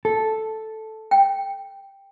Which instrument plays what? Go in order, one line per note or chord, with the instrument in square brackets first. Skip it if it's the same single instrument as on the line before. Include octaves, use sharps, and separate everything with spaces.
[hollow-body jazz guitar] A4
[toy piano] G5